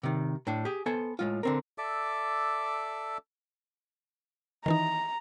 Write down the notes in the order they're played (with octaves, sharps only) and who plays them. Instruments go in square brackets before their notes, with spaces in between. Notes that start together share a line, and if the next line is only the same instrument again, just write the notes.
[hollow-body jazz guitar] C3 D#3
A2 D4
G4 G#4
B3 A4 C5 G#5
A2 G#3 F4
D3 C4 A#4
[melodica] A4 D5 E5 D6
[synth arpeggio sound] D#3 E3 D#4 [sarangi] A#5